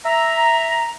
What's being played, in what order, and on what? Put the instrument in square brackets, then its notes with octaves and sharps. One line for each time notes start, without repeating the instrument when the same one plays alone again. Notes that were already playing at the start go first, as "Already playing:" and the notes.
[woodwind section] E5 A#5